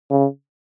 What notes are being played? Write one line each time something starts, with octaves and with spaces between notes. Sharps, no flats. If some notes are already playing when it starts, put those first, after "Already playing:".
C#3